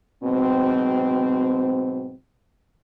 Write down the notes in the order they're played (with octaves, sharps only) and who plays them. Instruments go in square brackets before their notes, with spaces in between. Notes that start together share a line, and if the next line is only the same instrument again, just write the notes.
[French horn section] G#2 B2 F#3 C4